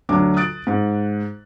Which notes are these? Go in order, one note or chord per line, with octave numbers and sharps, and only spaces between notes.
D2 F#3 D4 F#4 D6
D#6 F#6 A6 D7
G#2